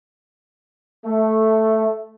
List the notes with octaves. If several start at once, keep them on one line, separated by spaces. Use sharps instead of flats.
A3